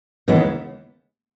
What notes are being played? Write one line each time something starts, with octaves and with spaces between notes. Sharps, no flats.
D#2 C#3 E3 G#3 B3